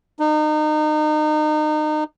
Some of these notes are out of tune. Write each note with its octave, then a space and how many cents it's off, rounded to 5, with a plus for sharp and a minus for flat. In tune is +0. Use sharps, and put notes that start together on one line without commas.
D#4 -30